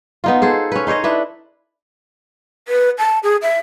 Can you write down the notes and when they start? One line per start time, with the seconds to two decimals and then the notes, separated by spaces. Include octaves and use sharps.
0.24 B3 D#4 F4
0.42 G#4 A4 C5
0.72 C#4 B4
0.87 D#4 C5 C#5 D#5
1.04 D4 E4 B4
2.68 B4
2.98 A5
3.23 G#4
3.42 E5